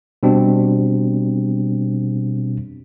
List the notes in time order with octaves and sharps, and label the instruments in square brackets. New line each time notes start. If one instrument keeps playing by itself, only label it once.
[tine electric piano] B2 G3 C4 D4